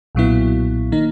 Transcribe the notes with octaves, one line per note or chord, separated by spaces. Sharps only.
B1 A#2 F#3 B3 E4
D#3 A#3 D#4